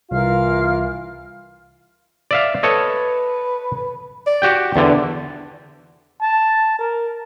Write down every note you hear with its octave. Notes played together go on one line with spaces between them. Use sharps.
C2 E3 F4 A#4 F5 F6
D5 E5 F5
A4 B4 C#5 D#5
D5
F#4 G4 G5
E2 D3 D4
A5
A#4